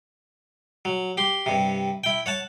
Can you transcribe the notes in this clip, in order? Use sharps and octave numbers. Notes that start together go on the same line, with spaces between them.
F#3
G4 C6
G2 C3
E4 G5
C#5 F#5 A5